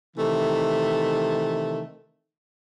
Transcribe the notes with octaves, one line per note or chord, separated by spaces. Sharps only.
C3 D#3 E3 A3